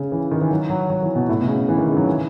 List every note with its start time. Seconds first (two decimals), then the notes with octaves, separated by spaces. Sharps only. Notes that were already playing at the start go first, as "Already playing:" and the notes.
Already playing: C#3
0.12 E3
0.31 D#3
0.41 E3
0.51 F#3
0.70 F#3
0.90 F#3
1.02 E3
1.15 B2
1.29 A2
1.41 B2
1.48 C#3
1.68 E3
1.78 D#3
1.87 C#3
1.97 F#3
2.05 E3